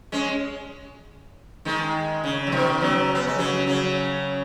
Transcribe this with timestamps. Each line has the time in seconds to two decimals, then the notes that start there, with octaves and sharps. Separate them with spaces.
0.12 G#3 C#4
1.65 D#3 G#3
2.24 C#3
2.47 F#3
2.52 B2 D#3
2.81 C#3 F#3
3.15 B3
3.27 G#3
3.38 C#3 F#3
3.67 C#3 F#3